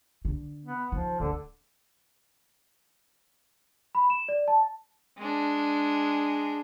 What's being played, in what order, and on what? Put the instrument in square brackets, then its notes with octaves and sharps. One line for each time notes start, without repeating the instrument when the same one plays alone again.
[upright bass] D3
[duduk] B3
[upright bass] D#3 [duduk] F3
[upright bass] D1 [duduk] D3
[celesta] B5
E7
D5
A5
[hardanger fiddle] G#3 D4